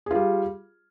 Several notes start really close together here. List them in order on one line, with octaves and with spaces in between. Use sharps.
G#4 F4 G3